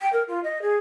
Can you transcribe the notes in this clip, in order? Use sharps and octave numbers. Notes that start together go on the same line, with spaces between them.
G5
A#4
F4
D#5
G#4